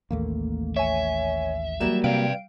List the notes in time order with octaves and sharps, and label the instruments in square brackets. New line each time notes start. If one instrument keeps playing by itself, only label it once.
[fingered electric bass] A1 D#2 A3 [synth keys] A#3
[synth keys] C#5 G#5 [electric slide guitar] E5
[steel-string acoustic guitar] F#3 G3 A#3 [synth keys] E7
[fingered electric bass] C3 [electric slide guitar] B4 D5 [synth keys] F5 G5 D7